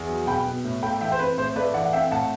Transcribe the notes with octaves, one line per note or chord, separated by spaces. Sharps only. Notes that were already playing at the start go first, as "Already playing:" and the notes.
Already playing: E2
F#3
B2 G5 B5
B3
A2
A3 G5 B5
E3 E5 G5
C5
C4 B4
A2 C5
A3 B4 D5
E3 D5 F#5
F#5
C4 E5 G5
A2 F#5 A5